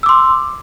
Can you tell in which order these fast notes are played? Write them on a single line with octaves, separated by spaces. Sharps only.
E6 D6 C6